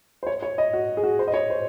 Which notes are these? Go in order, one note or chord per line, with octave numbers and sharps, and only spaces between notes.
C5
C#5
C#5
D#5
F#4
G#4
F#4
C5
D#5
C#5
C5